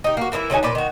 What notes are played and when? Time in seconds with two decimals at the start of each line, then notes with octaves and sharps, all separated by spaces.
0.04 D#4 G4
0.17 A#3 F#4
0.32 E3 A#3 D#4 E4
0.50 D3 F#3 D#4 G#5
0.63 A#2 B4 D5
0.75 D#3 F#4